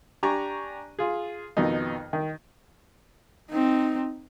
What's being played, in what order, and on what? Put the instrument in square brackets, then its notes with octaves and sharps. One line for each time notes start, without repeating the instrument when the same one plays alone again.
[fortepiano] D4 G4 D5 G#5 A#5 C#6
F4 G#4
F2 B2 D#3 D#4
D#3
[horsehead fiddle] C4 D#4